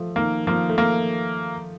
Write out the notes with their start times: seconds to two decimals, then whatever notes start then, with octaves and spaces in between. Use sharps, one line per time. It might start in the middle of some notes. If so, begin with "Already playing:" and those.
Already playing: F3 A3
0.16 D#3 A#3
0.47 F3 A#3
0.69 A3
0.78 A#3